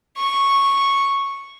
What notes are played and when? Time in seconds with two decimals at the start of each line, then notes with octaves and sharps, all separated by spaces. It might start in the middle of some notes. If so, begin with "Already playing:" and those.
0.17 C#6